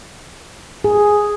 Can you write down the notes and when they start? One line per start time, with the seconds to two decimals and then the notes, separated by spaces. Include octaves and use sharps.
0.84 G#4